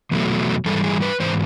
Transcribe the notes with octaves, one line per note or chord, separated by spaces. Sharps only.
E2 B2 F#3 A3
G#2 E3 G3 A4
G#4
B4
G#2 E3 C5